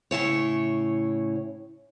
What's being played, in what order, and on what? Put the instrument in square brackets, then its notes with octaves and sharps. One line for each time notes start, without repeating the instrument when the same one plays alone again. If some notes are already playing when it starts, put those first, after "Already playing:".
[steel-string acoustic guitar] A2 C#3 E4 C#5